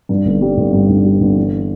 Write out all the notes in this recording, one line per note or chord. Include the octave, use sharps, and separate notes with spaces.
G2
G1
G3
G1
G2
G1
G3
G1
E3